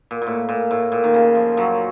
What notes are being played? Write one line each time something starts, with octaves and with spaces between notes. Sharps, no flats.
A#2
A#2
A2
A#2
A2
A#2
D#3
C#3
F3
F#2 F#3